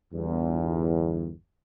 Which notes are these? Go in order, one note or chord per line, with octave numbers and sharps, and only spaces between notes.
G1 E2